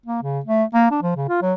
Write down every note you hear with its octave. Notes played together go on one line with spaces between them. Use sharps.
A#3
C#3
A3
A#3
D4
F3
C#3
F4
F#3